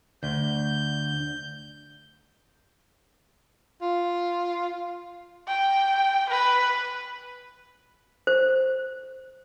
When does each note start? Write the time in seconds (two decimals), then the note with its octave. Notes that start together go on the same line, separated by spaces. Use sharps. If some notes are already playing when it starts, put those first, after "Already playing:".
0.23 D2 D3 G6
3.82 F4
5.48 G5
6.30 B4
8.27 C5